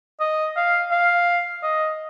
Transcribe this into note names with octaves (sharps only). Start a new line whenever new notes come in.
D#5
F5
F5
D#5